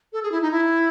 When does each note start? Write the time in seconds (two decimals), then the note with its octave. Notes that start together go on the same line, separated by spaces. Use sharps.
0.13 A4
0.23 G#4
0.32 E4
0.42 D#4
0.52 E4